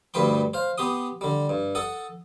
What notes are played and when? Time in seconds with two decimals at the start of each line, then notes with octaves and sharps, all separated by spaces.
0.14 D2 G2 G3 B4 G5 C6
0.54 C5 F5
0.78 B3 G4 C6 D#6
1.21 D3 G3
1.49 G2
1.75 A4 F#5 D#6